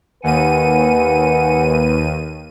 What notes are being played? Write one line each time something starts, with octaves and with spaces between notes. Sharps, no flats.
D#2 B4 F#5 G#5 D#7